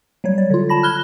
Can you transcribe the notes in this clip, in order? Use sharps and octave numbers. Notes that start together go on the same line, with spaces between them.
F#3 G3 C#5
D5
D3 F4
A5 B5 A#6
F6 F#6 G#6 G7